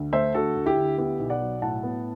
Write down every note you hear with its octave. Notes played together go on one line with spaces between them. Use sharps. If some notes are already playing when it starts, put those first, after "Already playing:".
Already playing: D2
A3 C5 E5
D3 F#4 A4
D2
E4 G4
D2
B3 E4 G4
B1
D5 F#5
F#3
A2 F#5 A5
B3